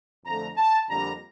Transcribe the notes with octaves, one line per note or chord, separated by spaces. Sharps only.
F2 D3 A3 A#5
A5
F2 D3 G3 A#3 A#5